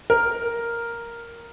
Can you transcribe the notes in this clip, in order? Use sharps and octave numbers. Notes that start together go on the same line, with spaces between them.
A#4